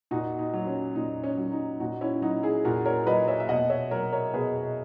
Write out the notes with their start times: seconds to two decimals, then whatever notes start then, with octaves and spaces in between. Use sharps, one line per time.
0.11 A#2 D#4 F#4
0.39 D#4
0.54 F#3
0.67 C#4
0.96 A#2 D#4
1.24 C#4
1.38 F#3
1.52 D#4
1.80 A#2 D#4 F#4
2.01 C#4 E4
2.22 F#3 D#4 F#4
2.43 E4 G#4
2.65 A#2 F#4 A#4
2.85 A#4 C#5
3.07 F#3 B4 D#5
3.28 C#5 E5
3.40 E5
3.49 B2 D#5 F#5
3.70 C#5 E5
3.91 F#3 A#4 C#5
4.13 A#4 C#5
4.34 B2 G#4 B4